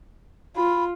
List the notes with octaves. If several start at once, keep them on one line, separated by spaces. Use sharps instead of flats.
F4 B5